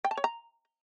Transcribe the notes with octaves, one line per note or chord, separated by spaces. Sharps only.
G5
A5
C#5
A#5